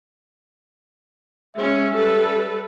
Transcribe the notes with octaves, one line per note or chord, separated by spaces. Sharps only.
G#3 C#4 E5
G3 A4 B4